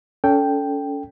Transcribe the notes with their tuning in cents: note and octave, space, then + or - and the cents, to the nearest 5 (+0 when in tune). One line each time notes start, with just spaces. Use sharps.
C#4 +35 A4 +0 G5 +0